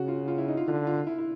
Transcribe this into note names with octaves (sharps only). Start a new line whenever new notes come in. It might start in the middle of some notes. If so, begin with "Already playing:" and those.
Already playing: C#3 F#4
F4
F4
E4
D#4
F4
D3 F4
F4
E4
E4